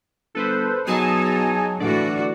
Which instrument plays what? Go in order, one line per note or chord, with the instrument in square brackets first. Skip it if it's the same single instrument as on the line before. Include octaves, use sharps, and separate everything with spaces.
[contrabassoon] G1 [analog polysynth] A4 B4 C5
[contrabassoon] B2 [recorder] F#3 [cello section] D#4 [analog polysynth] G#4 G#5 A5
[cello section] A2 E3 F#4 [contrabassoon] D3 [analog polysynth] D5